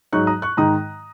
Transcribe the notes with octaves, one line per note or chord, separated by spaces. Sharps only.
G#2 F#3 D#4 C#6 F#6
A#5 D#6
C#6 F#6
G#2 D#3 G#3 D#4 A#5 D#6